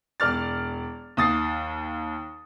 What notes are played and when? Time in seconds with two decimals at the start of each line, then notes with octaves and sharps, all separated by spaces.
0.20 E1 D5 F6 A6
1.17 D#2 D#6 A6 C7